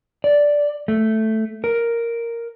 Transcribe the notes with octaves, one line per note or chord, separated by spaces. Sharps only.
D5
A3
A#4